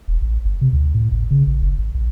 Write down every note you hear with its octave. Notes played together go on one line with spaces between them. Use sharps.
E1
A1
G1
C3
D2
A2
G#1
C#3
A1
F#1
G#1
A#1